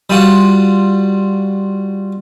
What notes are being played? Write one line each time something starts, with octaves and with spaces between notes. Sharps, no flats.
G3 F4 F#4